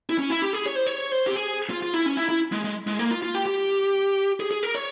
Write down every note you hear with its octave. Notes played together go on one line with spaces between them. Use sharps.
E4
C#4
E4
G4
G#4
C#5
C5
C#5
C5
G4
G#4
F4
F4
E4
C#4
E4
E4
G#3
G#3
G#3
A#3
F4
F4
G4
G4
G#4
G#4
A#4
C#5